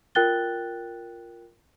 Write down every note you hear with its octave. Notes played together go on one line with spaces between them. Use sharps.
F4 A#4 G5 F#6 A6 G7